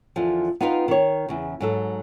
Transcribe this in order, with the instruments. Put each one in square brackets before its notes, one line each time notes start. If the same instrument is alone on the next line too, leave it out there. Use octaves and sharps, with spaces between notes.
[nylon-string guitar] E2 D3 F3
B3 D#4 F4 B4 F5 G5
D#3 C#5
E2 C#3
G#2 F#3 A4